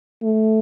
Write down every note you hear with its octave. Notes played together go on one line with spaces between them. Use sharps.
A3